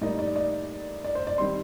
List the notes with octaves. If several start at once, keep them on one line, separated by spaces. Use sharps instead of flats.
A2 G3 A#3 D#4 D5
D5
D5
D5
C5
D5
D#3 G3 C4 C6